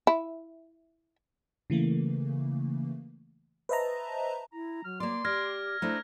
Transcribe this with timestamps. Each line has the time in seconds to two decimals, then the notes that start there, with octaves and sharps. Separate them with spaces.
0.07 E4
1.70 C#3 E3 A3 A#3
3.69 B4 C5 D#5 E5 A5 A#5
4.52 E4 A#5
4.84 F#3 F6
5.00 A#3 D5 C6
5.25 G4 D5 F6 G#6 A#6
5.82 A3 D4 E4 C5 A#5